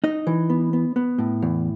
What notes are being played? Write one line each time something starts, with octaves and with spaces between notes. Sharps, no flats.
D#4 D#5
E3
B3
B3
B3
A2
E2